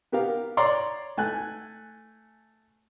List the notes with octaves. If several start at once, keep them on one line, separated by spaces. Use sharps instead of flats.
B3 G4 A#4 F5
C#5 D5 A#5 C6 D6
A3 G#5 F#6